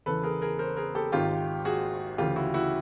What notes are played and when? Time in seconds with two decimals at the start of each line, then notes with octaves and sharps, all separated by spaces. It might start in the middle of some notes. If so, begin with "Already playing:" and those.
0.06 E2 C#3 E3 A4 B4
0.23 G#4 A#4
0.42 G#4 A#4
0.59 A#4 C5
0.76 G#4 A#4
0.95 G4 A4
1.12 G#1 G#2 D#3 F4 G4
1.65 F#4 G#4
2.18 D2 C#3 E3 F4 G4
2.36 E4 F#4
2.54 E4 F#4